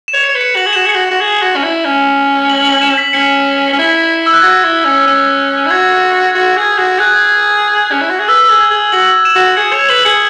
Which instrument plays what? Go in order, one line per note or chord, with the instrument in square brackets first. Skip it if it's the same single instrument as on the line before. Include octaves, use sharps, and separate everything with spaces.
[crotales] E7
[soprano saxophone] C#5
[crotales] C#7
[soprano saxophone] C#5
B4
[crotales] C#7
[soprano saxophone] F#4 [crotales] F#7
[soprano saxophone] G#4
[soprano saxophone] F#4 [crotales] E7
[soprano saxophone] G#4 [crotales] C#7
[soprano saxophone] F#4
[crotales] F#7
[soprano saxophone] F#4
G#4
F#4
C#4
E4
C#4
[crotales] F#7
F#7
E7
B6
[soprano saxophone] C#4 [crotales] C#7
[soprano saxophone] C#4
E4
[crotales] E6
F#6
[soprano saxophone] F#4 [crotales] G#6
[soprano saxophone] E4
C#4
C#4
E4
[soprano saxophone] F#4 [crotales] G#6
[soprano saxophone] F#4
G#4
F#4
[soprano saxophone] G#4 [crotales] F#6
[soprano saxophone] C#4
E4
F#4
G#4
[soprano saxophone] B4 [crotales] E6
[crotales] E6
[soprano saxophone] G#4
[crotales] G#6
[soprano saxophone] G#4
[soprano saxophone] F#4 [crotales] F#7
[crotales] E7
[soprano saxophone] F#4
[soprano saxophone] G#4 [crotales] C#7
[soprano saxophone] C#5 [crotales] C#7
[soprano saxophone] B4 [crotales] F#7
[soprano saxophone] G#4 [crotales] C#7